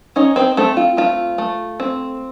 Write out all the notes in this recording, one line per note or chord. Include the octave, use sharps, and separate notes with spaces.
C#4 D#4 C#5
C4 C5
A3 C4 A4
F4
A3 F4
A3
C4